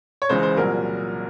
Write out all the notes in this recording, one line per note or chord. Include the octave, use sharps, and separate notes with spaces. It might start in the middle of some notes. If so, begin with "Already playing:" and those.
C#5
C#2 C#3 E3 C5
C5
C2 A#2 F#3 A#4